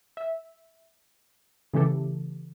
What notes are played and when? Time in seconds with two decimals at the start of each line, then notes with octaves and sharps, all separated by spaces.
0.17 E5
1.73 C#3 E3 A3 C#4 G4 A4